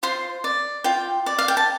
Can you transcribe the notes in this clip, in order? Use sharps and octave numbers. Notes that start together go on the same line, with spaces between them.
F4 C5 C6
D5
F4 G5
D5
F5
G5
A5